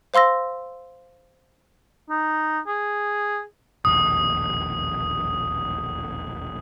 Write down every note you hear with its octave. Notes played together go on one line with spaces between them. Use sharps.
C5 F5 C6 E6 A#6
D#4
G#4
E1 A#1 D#2 D#6